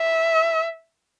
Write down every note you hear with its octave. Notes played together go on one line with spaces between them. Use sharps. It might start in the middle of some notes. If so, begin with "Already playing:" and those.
Already playing: E5